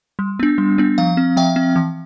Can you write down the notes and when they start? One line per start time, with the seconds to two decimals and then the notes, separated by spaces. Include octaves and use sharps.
0.19 G3
0.40 B3 D4
0.58 G3
0.78 B3 D4
0.98 F3 F5
1.17 C4
1.37 F3 E5 G5
1.56 C4
1.76 E3